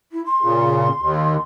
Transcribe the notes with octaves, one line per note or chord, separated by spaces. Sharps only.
E4
C6
A#2 C#3
D#2